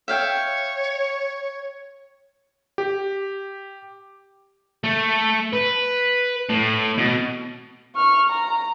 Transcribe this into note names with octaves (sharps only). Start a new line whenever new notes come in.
C#5 E5 F5 G5
G4
A3
B4
A2
B2
C#6 F6
A#5